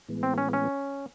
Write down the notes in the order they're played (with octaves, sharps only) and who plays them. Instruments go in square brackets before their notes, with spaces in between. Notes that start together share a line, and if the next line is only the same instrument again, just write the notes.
[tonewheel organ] A2 E3 G#3 B3
[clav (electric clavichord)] C4
C#4
C#4